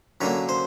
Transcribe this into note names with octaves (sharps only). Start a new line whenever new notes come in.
F#2 D3 F#3 A#3 C#5
C5